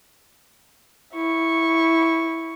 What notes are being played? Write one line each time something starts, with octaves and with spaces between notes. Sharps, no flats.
E4 C#6